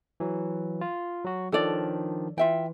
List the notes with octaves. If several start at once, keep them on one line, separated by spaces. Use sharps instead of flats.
E3 F#3
F4
F#3 F#4
D#3 F3 D4 A4 C#5 D5
E3 F4 E5 G5